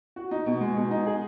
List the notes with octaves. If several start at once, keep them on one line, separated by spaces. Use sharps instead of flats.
F#4
D#4
B2
G#3
B2
D#4
G#4